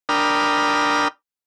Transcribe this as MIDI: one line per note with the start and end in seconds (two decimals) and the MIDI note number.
0.09 1.08 62
0.09 1.08 70
0.09 1.08 79
0.09 1.08 83
0.09 1.08 87
0.09 1.08 89